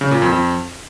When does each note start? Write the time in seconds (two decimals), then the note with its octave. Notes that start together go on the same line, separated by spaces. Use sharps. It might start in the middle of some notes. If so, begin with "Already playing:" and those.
0.01 C#3
0.11 A#2
0.22 F2
0.32 F2